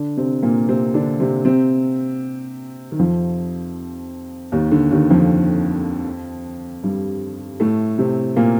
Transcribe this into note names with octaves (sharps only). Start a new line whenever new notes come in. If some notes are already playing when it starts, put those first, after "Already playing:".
Already playing: D3 D4
C3 C4
A#2 A#3
C3 C4
D3 D4
C3 C4
C3 C4
D#3
F2 F3
D#2 D#3
D3
D#2 D#3
F2 F3
G2 G3
A2 A3
C3 C4
A#2 A#3